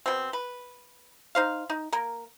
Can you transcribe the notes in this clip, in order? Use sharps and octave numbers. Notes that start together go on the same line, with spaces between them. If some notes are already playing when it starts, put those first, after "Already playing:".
B2 C4
B4
D#4 C5 F5
D#4
A#3 A#4